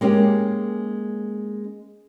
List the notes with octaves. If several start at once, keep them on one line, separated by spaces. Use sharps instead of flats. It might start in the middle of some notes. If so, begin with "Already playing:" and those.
G#3 A#3 C#4 G4